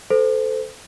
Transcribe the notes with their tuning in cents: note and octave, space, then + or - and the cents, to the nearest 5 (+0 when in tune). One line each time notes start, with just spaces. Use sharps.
A4 -5 C5 -25